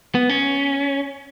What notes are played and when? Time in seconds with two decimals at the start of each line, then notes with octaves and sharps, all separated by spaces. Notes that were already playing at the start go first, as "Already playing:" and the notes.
0.15 B3
0.29 C#4